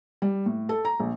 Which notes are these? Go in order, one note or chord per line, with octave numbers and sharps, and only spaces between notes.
G3
A2
A4
A#5
A#1